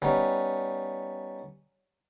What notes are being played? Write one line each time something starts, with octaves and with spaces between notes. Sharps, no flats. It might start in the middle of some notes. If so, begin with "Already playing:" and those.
G3 B3 C#4 D#4